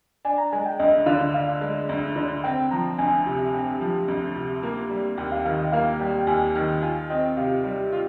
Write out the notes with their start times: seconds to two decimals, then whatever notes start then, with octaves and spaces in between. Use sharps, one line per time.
0.25 D4 G#5
0.38 A#5
0.52 G#3 G#5
0.66 G5
0.79 D2 D#5
1.06 D3 F5
1.34 D4 F5
1.61 G#3
1.89 D2
2.16 D3
2.44 C4 G5
2.71 F3 A#5
2.98 D2 G#5
3.26 C3
3.54 C4
3.81 F3
4.08 D2
4.36 C3
4.63 A#3
4.90 G3
5.18 D#2 G5
5.32 F5
5.45 D#3 F5
5.59 D#5
5.72 A#3 F5
5.99 G3 G5
6.19 G5
6.27 D#2 G#5
6.55 D#3
6.82 F4 G#5
7.10 C4 D#5
7.37 C3 F5
7.64 G3
7.92 F4